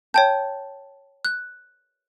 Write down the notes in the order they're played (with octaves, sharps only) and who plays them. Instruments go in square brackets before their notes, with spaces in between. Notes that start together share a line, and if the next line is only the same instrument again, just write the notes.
[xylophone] C#5 G5 G6 [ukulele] A5
[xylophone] F#6